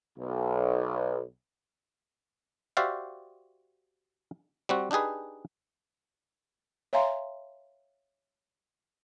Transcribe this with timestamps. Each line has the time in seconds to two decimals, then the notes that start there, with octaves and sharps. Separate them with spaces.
0.18 B1
2.77 F#4 G4 C5 D5 E5 F5
4.69 G3 C4 F#4
4.91 D4 D#4 G4 G#4 B4
6.93 C#5 E5 F5 G#5 A#5 C6